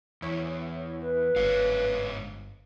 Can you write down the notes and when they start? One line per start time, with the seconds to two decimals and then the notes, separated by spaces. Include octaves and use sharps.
0.22 E2 E4 C#5
1.01 B4
1.36 G1 G#2 C#5 F5